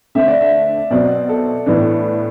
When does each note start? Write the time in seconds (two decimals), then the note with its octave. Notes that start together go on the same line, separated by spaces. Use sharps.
0.15 D3 A3 C4 E5
0.28 D5
0.41 E5
0.90 B2 F#3 C4 D5
1.29 A4
1.66 A2 E3 B3 D4